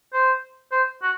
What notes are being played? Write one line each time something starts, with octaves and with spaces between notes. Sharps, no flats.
C5
C5
F#4